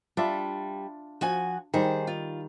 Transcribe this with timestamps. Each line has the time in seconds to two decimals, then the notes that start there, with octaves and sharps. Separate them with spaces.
0.17 G3 D4 F4 E5
1.21 F3 F#4 G#5
1.74 D#3 G3 G#4 C5
2.07 F4